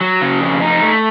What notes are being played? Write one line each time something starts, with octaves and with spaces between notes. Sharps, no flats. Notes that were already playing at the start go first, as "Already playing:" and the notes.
F#3
C#3
F2
D#4
A3